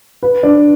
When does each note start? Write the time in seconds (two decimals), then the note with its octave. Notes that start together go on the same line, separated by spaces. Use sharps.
0.23 B4
0.43 D4